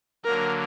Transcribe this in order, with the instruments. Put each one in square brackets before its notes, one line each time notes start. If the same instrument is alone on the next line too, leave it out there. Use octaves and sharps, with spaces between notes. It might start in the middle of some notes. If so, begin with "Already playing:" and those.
[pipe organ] D3 F#3 A#3 [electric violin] A#4